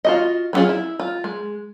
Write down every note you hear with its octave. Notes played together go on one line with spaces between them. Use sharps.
F4 F#4 D#5
F#3 B3 C#4 F4 G#4
E4
F4
G#3